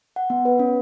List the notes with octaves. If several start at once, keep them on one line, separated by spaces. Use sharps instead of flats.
F#5
B3
B4
C#4